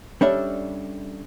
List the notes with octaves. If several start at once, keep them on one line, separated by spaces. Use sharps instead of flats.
G3 C#4 D4 A4 E5